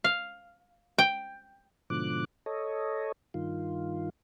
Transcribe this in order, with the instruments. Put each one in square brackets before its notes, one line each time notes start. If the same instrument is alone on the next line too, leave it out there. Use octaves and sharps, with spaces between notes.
[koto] F5
G5
[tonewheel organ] G#2 B2 D3 F3 D6 F#6
A4 C#5 D#5
G2 D#3 F4